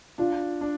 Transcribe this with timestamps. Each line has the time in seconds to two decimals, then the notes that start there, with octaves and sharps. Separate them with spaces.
0.18 D4 F4
0.61 D4